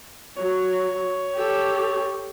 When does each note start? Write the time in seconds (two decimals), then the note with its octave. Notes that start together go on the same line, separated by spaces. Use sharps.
0.37 F#3 C#5
1.34 G4 A4